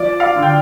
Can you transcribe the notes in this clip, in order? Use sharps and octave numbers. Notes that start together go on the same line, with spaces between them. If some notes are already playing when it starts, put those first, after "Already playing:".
Already playing: F3 D5
F5
D3
G5